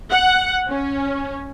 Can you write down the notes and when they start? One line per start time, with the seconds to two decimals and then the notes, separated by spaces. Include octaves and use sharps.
0.10 F#5
0.68 C#4